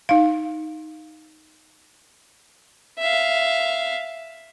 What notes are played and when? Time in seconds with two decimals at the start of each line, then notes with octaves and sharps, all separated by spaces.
0.09 D#4 F5
2.99 E5 F5